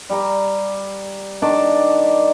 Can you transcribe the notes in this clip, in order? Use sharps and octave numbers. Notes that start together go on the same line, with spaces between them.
G3 A#5
D#3 D4 D5 A5